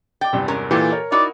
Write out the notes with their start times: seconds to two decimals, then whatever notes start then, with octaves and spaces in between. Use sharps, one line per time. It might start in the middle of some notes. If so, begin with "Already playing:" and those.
0.21 G5 D6 A6
0.33 E2 G2 C3
0.48 G#3 C#4 A#4
0.71 A#2 E3 G4 A4
0.93 A#4 C#5
1.12 D#4 E4 F#4 D5